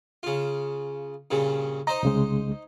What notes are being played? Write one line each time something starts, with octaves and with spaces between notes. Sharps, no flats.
C#3 F4
G2 A#2 C#3
D#4 C5 D#5 A#5
C2 C#3 G#3